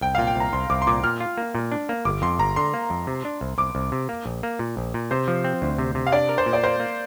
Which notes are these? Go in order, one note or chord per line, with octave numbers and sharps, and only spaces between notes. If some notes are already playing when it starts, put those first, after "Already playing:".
C2 G5
A#2 F5
G5
C2 A#5
C2 C6
C2 D6
C6
A#2 D6
A#2 F6
F4
A#3
A#2
D4
A#3
G1 D6
F2 C6
G1 A#5
D3 C6
A#3
F2
C3
D4
C2
C2 D6
C2
C3
A#3
A#1
A#3
A#2
A#1
A#2
C3 C5
F3
C4
D2
C3
C3
F5
D4 D5
A#4
C5
A#2
D5
A#3 C5
A#3